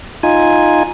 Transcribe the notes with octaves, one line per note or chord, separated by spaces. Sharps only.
D#4 F4 G#5